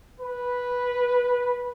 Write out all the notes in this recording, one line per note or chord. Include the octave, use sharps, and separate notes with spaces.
B4